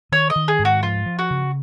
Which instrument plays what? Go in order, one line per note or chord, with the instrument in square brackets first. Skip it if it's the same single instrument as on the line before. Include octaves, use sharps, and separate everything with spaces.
[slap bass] D#3 [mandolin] C#5
[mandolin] D#5
[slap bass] D#3
[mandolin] G#4
[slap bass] G#2
[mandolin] F#4
[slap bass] F3 [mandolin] F4
[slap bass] F3
[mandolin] F#4
[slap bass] C#3